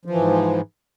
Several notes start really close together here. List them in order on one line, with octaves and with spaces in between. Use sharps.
F3 E3 G#2